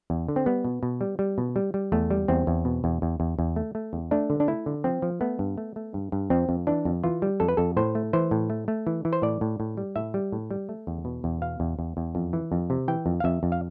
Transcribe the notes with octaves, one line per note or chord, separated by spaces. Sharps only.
E2
D3
C4
G3 B3
B2
B2
G3
G3
B2
G3
G3
E2 A3
G3
E2 C4
E2
B2
E2
E2
E2
E2
A3
A3
E2
A3 D4
D3
D4
A3 E4
D3
F3 C4
F3
A3 B3
G2
A3
A3
G2
G2
F2 C4
F2
E3 D4
F2
E3 F4
G3
F2 A4
B4
F2 A4
A2 C5
A3
E3 C5
A2
A3
A3
E3
E3
C5
A2 D5
A2
A2
G3
A2 E5
G3
A2
G3
A3
E2
B2
E2
B2 F5
E2
E2
E2
F2
E3
F2
C3
E3 G5
F2
F5
F2 E5
F2
F5